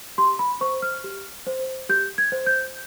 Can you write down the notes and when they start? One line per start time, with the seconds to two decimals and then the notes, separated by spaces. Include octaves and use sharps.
0.18 G4 C6
0.39 B5
0.61 C5 C#6
0.82 F6
1.04 G4
1.47 C5
1.89 G4 G6
2.18 G#6
2.32 C5
2.46 G6